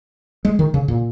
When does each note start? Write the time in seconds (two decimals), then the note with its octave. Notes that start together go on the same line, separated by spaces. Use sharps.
0.45 G#3
0.59 D#3
0.74 C#3
0.88 A#2